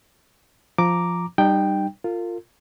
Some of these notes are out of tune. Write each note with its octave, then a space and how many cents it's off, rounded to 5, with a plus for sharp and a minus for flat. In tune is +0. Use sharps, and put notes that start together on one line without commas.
F3 +0 A#5 +0 D6 +0
G3 +0 D#4 -35 G5 +0
F4 +0 A#4 -40